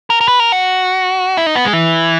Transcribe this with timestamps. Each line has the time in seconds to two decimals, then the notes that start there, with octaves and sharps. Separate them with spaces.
0.10 A#4
0.21 A#4
0.28 B4
0.40 A#4
0.52 F#4
1.37 E4
1.46 D#4
1.55 B3
1.65 G#3
1.73 E3